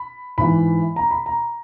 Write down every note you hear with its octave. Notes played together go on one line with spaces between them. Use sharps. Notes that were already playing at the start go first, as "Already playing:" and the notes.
Already playing: B5
G#2 E3 B5
A#5
B5
A#5